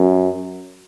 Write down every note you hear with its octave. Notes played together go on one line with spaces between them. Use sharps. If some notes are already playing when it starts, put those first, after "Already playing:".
Already playing: F#2